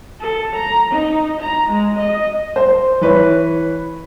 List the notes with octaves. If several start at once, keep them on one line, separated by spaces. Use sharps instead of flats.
A4
A#5
D#4
A#5
G#3
D#5
C5
E3 B4 C#5